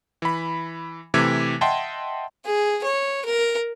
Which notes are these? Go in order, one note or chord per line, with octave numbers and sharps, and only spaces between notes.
E3 B5
C3 E3 A3 D6 G#6
D#5 E5 F#5 G5 A5 C6
G#4
C#5
A#4